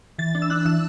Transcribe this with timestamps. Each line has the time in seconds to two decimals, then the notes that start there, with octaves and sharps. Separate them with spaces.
0.18 E3 A6
0.35 D4
0.42 E6
0.50 D4 F#6
0.65 E3 E6